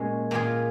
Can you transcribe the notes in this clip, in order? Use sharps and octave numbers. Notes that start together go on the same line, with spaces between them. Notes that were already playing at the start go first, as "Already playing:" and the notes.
Already playing: A#2 G#3 C#4 G#4
A#2 A#3 F4 G#4